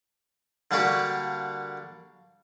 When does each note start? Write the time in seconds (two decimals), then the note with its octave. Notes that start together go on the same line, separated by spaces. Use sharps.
0.71 D3 G3 A#3 D4 F#4 G4